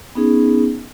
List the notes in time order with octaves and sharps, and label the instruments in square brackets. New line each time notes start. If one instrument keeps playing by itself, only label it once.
[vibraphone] B3 C#4 D#4 G#4